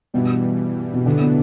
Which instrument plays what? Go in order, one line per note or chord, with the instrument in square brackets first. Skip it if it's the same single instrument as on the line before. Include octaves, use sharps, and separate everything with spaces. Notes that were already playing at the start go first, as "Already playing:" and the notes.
[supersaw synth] G2 E3 G3 [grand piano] B2
[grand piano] B2
[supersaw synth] A2 E3 B3 D4 [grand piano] D3
[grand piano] B2